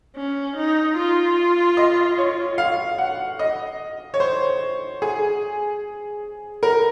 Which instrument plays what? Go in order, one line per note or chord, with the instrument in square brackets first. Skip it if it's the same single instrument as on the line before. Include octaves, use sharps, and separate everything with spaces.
[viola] C#4
D#4
F4
[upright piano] D#5
C#5
F5
F#5
D#5
C#5
C5
G#4
A#4